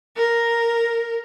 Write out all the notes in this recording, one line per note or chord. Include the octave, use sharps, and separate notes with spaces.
A#4